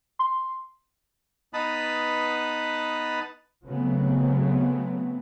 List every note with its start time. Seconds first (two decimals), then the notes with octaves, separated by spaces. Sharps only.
0.19 C6
1.53 B3 D#4 B4 A5 B5 D#6
3.66 C#3 F#3 A3 B3 C4